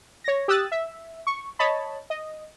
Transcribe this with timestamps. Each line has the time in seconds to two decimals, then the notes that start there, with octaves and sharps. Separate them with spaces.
0.24 C#5 A#6
0.48 G4 D#6 E6 F#6 A6
0.72 E5
1.27 C#6
1.59 C#5 D#5 A5 B5
2.10 D#5